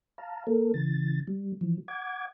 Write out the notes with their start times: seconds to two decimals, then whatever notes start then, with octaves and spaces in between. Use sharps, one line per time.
0.18 F5 A5 A#5
0.47 A#3 A4 A#4
0.74 C#3 E3 A6
1.27 G3
1.61 E3 F3
1.88 F#5 D6 G#6